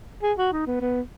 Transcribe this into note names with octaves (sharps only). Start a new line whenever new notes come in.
G#4
F#4
D#4
B3
B3